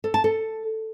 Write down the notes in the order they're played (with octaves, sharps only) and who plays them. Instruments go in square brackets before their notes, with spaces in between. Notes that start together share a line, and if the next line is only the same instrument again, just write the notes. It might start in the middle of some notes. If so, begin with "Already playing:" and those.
[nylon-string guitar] A4
A5
A4